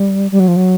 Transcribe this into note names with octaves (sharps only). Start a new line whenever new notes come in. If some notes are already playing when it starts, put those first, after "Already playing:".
Already playing: G3
G3
F#3
F3
F#3